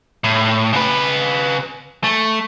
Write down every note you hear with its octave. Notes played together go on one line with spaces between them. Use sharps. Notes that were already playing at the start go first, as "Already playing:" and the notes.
A2
C#3 B4
A3